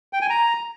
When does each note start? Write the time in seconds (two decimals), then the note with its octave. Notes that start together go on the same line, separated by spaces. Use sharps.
0.13 G5
0.21 G#5
0.30 A#5